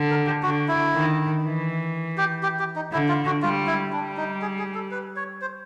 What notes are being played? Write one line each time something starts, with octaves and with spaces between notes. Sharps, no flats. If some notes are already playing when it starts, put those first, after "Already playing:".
Already playing: D3
A#4
G4
D3 F#4
E4
D#3
E3
G4
G4
G4
D#4
D3 E4
F4
F#4
G3 F4
E4
G3 D4
D#4
G#4
G#4
A4
B4
C#5
C5